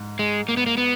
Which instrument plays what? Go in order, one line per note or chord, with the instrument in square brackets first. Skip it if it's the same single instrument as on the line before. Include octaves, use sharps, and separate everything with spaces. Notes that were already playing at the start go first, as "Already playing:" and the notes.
Already playing: [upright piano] G#2
[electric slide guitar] G#3
A#3
B3
A#3
B3